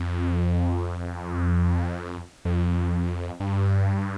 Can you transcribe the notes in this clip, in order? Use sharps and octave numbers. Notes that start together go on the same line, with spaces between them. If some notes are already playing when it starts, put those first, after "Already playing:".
Already playing: F2
F2
G2